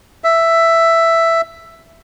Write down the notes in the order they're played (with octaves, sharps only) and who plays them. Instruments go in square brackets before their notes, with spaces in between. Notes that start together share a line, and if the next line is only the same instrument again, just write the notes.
[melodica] E5